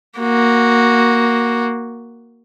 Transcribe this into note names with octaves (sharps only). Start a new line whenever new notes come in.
A#3 F#4